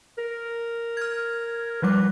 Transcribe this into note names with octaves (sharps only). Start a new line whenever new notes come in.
A#4
F6 G#6
F3 G3 B4 D6